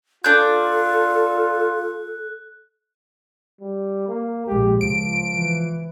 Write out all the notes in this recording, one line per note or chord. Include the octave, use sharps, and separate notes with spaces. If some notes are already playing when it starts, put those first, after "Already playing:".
D4 F4 A4 F#6 G6
G3
A#3
A#1 G#3 G4
C#2 F3 D7
E3